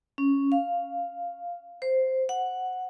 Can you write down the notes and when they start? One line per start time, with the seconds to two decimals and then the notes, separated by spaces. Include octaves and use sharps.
0.18 C#4
0.52 F5
1.82 C5
2.29 F#5